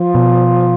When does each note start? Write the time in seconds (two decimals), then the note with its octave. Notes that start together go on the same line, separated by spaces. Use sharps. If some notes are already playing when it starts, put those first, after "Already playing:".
Already playing: F3
0.15 B2